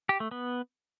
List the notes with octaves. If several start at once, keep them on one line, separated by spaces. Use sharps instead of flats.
G4
A3
B3